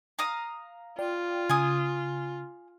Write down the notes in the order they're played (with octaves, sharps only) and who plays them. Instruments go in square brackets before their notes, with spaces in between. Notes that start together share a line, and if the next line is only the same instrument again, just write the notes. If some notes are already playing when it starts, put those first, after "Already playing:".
[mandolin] F5 A#5 D#6
[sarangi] F4 [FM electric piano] D5 G5
[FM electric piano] C#3 [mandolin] G#5 D#6